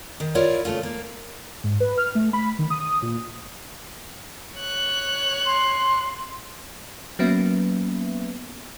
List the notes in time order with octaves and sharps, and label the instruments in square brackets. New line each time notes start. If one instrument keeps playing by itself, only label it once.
[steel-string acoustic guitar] D#3
E4 F4 A#4 C#5 D5
C#3 A3 C#4 F4
A#3
[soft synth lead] G#2
B4
F6
A3
B5
D#3
D#6
A#2
[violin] C#5 F#6
[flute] C6
[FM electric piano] F#3 A#3 B3 C#4 B4 E5